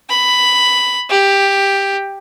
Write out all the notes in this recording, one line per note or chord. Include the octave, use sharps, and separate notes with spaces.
B5
G4